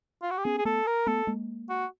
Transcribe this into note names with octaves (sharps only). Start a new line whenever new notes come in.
F4
F#4
G4
B3 C#4 G#4
G#4
A3 B3 A4
A#4
A3 B3 A4
G#3 A#3
F#4